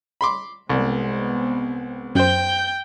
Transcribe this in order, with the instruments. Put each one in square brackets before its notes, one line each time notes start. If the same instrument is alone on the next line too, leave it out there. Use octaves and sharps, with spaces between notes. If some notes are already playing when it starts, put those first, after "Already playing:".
[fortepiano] B5 C6 D6
[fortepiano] C2 [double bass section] G#3 B3 C4
[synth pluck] F#2 C5 [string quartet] G5 G6